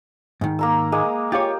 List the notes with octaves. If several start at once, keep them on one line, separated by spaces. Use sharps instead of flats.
G#2 D#3
A#3 A#5 E6
G#3 A#3 D#6
F4 G4 C#5